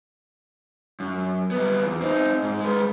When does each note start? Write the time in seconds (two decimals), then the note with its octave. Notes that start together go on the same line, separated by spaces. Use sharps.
1.00 F#2
1.51 G3 B3
1.83 E2
2.01 C4 D#4
2.42 G#2
2.60 G#3 B4